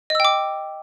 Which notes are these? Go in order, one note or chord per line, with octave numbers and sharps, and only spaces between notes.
D#5 G5 D6 E6